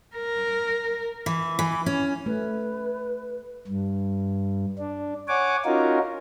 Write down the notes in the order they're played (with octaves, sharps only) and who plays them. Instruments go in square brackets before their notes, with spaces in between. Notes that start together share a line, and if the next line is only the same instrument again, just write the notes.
[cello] A#4
[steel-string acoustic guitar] E3
E3
C#4
[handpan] A3 [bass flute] B4
[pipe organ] G2
D4
C#5 F#5 G#5 D6
C#4 D#4 F4 F#4 A#4